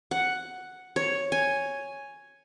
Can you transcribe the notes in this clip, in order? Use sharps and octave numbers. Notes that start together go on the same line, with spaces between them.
F#5
C#5
G#5